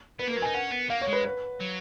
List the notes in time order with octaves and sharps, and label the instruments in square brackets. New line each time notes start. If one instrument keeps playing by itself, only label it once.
[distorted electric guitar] B3 [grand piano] B4
[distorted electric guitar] A#3 [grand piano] A#4
[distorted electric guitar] F#3
[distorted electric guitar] D#4 [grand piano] G#5
[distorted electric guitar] C#4 [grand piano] F#5
[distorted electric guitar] B3
[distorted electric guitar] A#3 [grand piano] F5
[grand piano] C#5
[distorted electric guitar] G#3
[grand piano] B4
B4
[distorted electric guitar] F#3